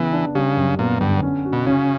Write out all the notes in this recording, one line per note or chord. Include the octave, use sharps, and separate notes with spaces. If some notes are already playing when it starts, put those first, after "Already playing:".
Already playing: C#3 E3 B3
D4
C#3 G3
F#2
A#2 B3
G2 D3
C#4
F#4
B2
C#3 C#4